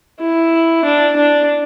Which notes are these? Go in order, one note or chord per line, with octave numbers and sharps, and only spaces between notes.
E4
D4
D4